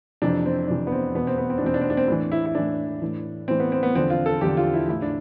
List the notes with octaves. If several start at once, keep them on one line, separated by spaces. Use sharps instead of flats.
F2 C3 E3 D4
C4
F2 C3 E3 D4
B3
C4
E2 B2 B3
C4
B3
C4
D4
E2 B2 C4
D4
C4
D4
C4
A2 E3 D4
E4
E4
A2 E3 D4
A2 E3
A2 E3 C4
B3
C4
B3
E2 D3 F3 C4
F4
A4
E2 D3 F3 G4
F4
E4
A2 E3 E4
D4